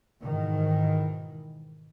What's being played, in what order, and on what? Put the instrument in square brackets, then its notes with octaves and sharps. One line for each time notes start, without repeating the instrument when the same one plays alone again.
[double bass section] G#2 B2 D#3 E3